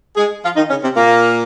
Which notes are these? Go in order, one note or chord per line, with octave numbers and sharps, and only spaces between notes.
G#3 G#4
F3 F4
D#3 D#4
C#3 C#4
C3 C4
A#2 A#3